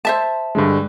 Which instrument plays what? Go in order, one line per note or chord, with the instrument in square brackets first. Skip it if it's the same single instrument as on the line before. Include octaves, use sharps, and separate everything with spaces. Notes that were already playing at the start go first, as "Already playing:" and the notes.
[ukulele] C5 E5 A5
[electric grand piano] G2 D3 G#3